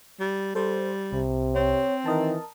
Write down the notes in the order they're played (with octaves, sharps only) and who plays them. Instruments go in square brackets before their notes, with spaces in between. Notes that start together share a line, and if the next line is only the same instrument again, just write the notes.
[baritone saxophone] G3
[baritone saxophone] G3 [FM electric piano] A4 C5
[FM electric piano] C2 [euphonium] C3
[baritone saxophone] C4 [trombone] C#5
[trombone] D#3 [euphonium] E3 [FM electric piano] A#4 D#5 A5